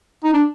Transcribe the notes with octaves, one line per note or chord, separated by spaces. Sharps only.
D#4
D4